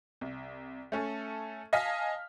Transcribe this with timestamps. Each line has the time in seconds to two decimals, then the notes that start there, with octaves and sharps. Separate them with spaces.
0.21 C2
0.92 A3 C#4 A4
1.73 D#5 F5 G#5 A5 F6 B6